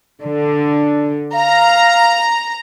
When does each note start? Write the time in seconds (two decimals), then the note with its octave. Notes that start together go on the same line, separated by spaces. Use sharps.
0.22 D3 D4
1.34 F5 A#5